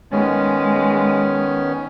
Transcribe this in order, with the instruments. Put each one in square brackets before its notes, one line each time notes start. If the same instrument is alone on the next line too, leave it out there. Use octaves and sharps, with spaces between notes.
[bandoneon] D#3 B3 C#4 [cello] G#3